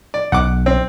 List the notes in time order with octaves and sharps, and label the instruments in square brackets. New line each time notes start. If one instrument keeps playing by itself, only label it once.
[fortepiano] D5
[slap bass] B1 [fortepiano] F#5 D6
[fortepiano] C4